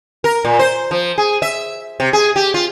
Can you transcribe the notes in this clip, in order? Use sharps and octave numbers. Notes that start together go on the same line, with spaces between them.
A#4
A#2
C5
F3
G#4
E5
C3
G#4
G4
F4